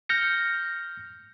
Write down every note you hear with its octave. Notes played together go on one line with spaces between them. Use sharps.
F6 G6 A#6 C#7